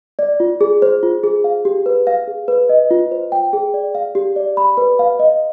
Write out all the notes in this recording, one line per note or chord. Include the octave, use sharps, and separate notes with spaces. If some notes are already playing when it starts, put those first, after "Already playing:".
D5
F4
G#4
C5
F4
G#4
F5
G4
B4
F5
G#4
B4
D#5
F4
C5
G5
G#4
D5
F5
G4
D5
B5
B4
F5
D#5